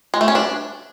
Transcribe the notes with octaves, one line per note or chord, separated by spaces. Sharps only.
G#3
A3
C#4
D4